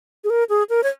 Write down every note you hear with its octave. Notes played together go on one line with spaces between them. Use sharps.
G#4
A#4
G#4
A#4
C#5